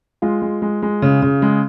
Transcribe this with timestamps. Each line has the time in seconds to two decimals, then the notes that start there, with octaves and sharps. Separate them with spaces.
0.22 G#3 F4
0.42 G#3
0.62 G#3
0.82 G#3
1.02 C#3
1.22 C#3
1.42 G#3